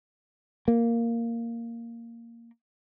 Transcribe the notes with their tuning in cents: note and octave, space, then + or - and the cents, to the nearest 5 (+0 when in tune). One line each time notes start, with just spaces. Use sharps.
A#3 -5